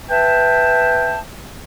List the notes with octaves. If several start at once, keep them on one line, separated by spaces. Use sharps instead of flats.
B4 E5 G5 A5